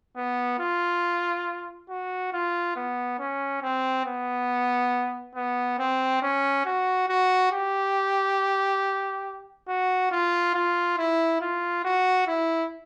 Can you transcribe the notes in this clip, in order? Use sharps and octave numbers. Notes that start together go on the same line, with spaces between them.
B3
F4
F#4
F4
B3
C#4
C4
B3
B3
C4
C#4
F#4
F#4
G4
F#4
F4
F4
E4
F4
F#4
E4